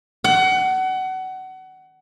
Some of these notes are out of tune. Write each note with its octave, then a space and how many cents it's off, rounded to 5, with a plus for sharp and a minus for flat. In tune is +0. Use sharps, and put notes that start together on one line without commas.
F#5 +25